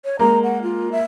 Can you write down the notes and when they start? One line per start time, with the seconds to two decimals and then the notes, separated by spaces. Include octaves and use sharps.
0.05 C#5
0.19 G#3 A#3 A#5
0.43 F#5
0.63 F4
0.92 E5